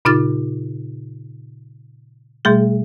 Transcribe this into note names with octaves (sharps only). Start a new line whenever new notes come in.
A#2 C#3 D#4 F4 F6 A6
B2 G3 A3 G#4